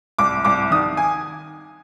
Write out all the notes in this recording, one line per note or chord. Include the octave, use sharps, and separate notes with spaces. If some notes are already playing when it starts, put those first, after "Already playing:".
C2 D6
C2 D6
D#3 D#6
G#5